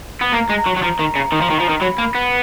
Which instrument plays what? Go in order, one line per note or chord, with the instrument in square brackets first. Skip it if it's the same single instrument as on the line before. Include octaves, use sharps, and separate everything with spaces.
[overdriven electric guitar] B3
[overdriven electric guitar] A#3 [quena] A#5
[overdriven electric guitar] G#3
[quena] A#5
[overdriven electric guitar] F#3
F#3
[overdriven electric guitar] F3 [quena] A#5
[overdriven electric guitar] D#3
C#3
D#3
F3
D#3
F3
D#3
[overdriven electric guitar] F#3 [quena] B5
[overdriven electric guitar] A#3
B3